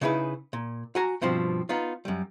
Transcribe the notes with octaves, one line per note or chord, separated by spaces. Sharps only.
C#3 D#4 E4 G#4 B4
A#2
F#4 G#5 A#5
G2 B2 F3 C4
B3 D#4 F4
F#2 G3